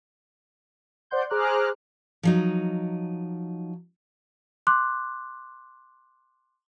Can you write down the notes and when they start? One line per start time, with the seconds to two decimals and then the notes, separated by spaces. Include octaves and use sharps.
1.11 C5 D5 F#5 C6 G6
1.30 G#4 C5 A#5 D6 F6 F#6
2.23 F3 F#3 D#4
4.67 C6 D6 F#6